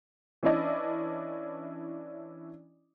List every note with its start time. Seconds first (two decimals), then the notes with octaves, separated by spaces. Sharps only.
0.43 E3 C#4 D4 E4 D5 D#5